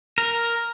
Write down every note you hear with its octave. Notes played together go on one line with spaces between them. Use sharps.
A#4